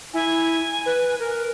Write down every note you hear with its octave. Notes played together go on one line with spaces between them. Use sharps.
E4 G#5
B4
A#4